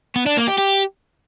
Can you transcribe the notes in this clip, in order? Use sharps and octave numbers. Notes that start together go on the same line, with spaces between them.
B3
D4
A#3
G4
G4